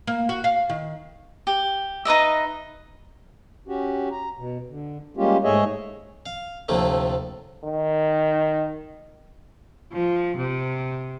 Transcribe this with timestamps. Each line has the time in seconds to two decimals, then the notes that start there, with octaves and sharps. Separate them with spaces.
0.07 A#3
0.29 F#4
0.44 F5
0.69 D#3
1.47 G4
2.05 D#4 B4 D#5 E5
3.68 C#4 F#4 G4
4.11 A#5
4.37 B2
4.69 D3
5.17 G3 G#3 A#3 C#4 F4 G4
5.44 G#2 A3 G#4 C#5 D#5 E5
6.26 F5
6.69 D2 A2 C3 F3 A3 A#3
7.65 D#3
9.93 F3
10.37 C3